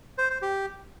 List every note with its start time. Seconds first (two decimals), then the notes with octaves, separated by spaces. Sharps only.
0.18 C5
0.30 C5
0.42 G4